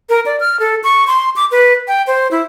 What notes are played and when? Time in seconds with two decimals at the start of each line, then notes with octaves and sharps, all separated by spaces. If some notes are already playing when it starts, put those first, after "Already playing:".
0.09 A#4
0.26 D5
0.40 F6
0.60 A4
0.84 C#6
1.07 C6
1.36 D6
1.52 B4
1.88 G5
2.07 C5
2.31 E4